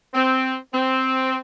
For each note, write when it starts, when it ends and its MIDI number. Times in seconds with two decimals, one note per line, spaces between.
0.14 0.54 60
0.73 1.34 60